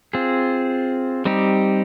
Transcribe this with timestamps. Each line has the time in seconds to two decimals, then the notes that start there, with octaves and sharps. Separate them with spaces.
0.13 C4 F4 G#4
1.25 G3 C4 D#4 G4